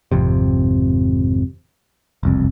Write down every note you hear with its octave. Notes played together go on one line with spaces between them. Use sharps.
G#1 F2 C3
E1 C2 F2